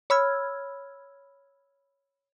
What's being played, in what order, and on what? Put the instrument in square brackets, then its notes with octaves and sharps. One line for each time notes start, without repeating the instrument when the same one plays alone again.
[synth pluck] C#5 B5 E6 F6 G#6